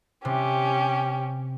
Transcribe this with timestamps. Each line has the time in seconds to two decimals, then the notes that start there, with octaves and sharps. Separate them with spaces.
0.25 C3 C#4 G4